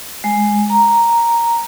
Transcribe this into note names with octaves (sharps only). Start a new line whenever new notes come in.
G#3
A#5